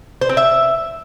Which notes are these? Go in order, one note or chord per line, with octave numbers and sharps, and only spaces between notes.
C5
C4
E5